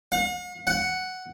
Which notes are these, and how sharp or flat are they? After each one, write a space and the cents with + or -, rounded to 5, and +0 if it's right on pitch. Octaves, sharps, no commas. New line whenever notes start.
F#5 -45
F#5 +5